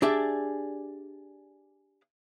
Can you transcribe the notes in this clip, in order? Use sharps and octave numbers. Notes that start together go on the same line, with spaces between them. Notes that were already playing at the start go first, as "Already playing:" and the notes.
D4 G4 G#4 D5 E5